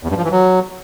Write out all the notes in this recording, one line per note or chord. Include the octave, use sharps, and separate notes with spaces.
E2
G2
F3
E3
F#3